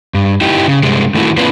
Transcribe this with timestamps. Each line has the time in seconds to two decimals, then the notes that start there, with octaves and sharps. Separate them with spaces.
0.14 G2
0.41 D#4 E4 G4
0.67 C#3
0.83 G2 C3 G#3
1.14 D#3 A3 C4 E4 F#4
1.38 A#3 C4 D4 E4 F4 B4